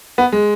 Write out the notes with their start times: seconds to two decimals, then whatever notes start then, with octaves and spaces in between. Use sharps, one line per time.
0.18 B3
0.32 G#3